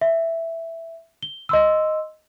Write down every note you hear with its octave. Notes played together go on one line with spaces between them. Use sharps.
E5
G7
D#5 C6 E6